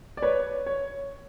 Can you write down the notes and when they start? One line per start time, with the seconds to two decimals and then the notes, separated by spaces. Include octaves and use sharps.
0.17 D5
0.22 B4 C#5
0.66 C#5